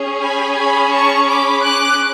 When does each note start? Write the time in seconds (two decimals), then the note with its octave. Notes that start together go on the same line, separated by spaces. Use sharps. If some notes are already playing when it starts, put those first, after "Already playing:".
Already playing: C#4 G#4
0.21 G#5 B5
0.56 G#5 B5
0.91 A5 C#6
1.26 B5 D6
1.61 D6 F#6